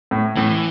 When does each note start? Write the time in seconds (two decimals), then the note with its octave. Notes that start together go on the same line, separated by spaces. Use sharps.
0.11 A2
0.36 A2 E3